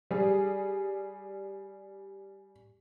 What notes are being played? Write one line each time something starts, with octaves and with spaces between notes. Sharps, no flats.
G3 G#4